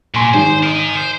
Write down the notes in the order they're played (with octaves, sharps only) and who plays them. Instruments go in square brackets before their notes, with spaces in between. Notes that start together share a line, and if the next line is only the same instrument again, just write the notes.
[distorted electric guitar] A#2 [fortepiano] G#5 C6
[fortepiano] G#1 [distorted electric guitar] C5
[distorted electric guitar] A#4 D#5
C5